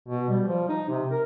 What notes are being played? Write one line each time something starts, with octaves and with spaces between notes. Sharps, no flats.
B2
G3
F3
D#4
C3
A#4